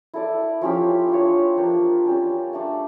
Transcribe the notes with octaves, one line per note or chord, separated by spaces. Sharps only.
E4 A4 D5
F3 C#4 E4 G4
D4 F4 C#5
F3 A#3 D4 G4
G3 C#4 G4
A3 D4 A4